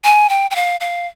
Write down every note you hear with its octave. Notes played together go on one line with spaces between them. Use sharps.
G#5
G5
G5
F5
F5